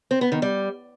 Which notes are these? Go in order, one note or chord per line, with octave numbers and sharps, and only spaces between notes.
C4
B3
D#3
G3